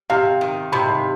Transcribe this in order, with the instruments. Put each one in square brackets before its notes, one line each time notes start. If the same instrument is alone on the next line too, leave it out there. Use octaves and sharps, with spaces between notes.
[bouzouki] C3 [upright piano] F5
[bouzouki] D#3
[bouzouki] C3 [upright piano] B5